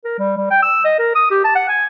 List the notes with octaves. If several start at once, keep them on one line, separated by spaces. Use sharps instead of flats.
A#4
G3
G3
G5
E6
D#5
A#4
D#6
G4
A5
F#5
G#5